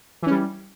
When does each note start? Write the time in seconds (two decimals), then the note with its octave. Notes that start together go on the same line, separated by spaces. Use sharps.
0.23 E3
0.27 C#4
0.31 G3